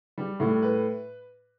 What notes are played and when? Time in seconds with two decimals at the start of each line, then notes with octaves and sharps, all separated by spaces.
0.18 G3
0.40 A2
0.62 B4